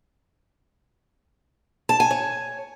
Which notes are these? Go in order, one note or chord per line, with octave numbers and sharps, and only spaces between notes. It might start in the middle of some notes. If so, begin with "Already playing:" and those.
A5
G#5
C#5